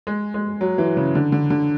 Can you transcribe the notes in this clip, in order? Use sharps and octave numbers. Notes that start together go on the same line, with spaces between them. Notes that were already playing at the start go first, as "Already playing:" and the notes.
G#3
G#3
F#3
E3
C#3
D3
D3
D3